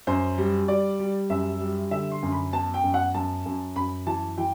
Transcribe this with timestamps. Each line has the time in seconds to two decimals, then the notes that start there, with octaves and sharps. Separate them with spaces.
0.07 F#2 C5
0.38 G3
0.68 G3 D5
1.00 G3
1.30 F#2 E5
1.60 G3
1.91 D3 E5
2.12 C6
2.23 F#2
2.32 B5
2.53 B3 A5
2.74 G5
2.84 F#2
2.94 F#5
3.14 F#2 A5
3.46 F#2
3.76 F#2 B5
4.07 E3 A5
4.38 E3 G5